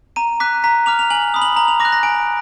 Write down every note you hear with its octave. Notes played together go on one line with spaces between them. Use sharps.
A#5 D#7
D6 F#6 B6
A#5 B6
D6 F6 F7
F7
G#5 F#7
B5 D#6
F#7
A#5 F#7
F7
D6 A#6
F#6
A#6
G#5 D7